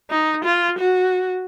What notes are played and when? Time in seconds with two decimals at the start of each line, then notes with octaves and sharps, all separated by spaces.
0.11 D#4
0.45 F4
0.79 F#4